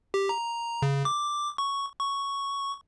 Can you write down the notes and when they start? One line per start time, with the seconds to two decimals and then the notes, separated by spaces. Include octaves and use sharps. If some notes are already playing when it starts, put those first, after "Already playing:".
0.14 G4
0.29 A#5
0.82 C#3
1.05 D6
1.58 C#6
2.01 C#6